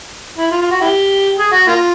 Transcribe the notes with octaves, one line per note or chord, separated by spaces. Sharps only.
E4
F4
F4
F#4
E4 G4
G#4
F#4
A#3 F4